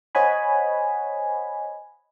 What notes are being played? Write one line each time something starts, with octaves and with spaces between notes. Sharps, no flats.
C5 C#5 D#5 F#5 G#5 B5